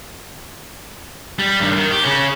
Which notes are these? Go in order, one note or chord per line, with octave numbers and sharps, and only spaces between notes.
G3
G2 D#3
D#3
G4
C#3 C#4